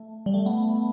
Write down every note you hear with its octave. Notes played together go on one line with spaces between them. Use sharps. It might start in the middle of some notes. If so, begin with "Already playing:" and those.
Already playing: A3
G3
A3
B3